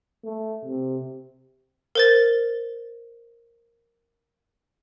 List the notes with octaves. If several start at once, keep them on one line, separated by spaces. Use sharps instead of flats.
A3
C3
A#4 C5 A6